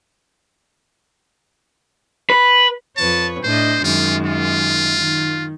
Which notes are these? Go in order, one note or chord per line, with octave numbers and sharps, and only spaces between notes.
B4
F2 B4 C#5 A5
A2 D4 C5 D#5
F#2 D#3 G#3 F4
F4
D#3